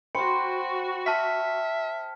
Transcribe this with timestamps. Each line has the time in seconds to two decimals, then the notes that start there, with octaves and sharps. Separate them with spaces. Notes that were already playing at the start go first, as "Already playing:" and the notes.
0.15 F#4 C5 G5 B5 C#7
1.06 E5 A5 F6 B6